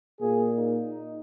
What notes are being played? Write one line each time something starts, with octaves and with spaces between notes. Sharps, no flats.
A#2 A#3 G#4
D#4